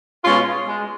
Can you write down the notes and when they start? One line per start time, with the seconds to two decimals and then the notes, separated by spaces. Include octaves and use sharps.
0.23 B2 G#3 C#4 F4
0.67 G#3